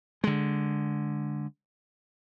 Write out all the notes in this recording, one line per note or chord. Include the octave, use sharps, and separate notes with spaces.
D3 G#3